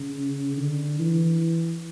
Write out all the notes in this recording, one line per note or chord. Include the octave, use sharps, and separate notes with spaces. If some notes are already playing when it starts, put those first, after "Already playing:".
Already playing: C#3
D3
E3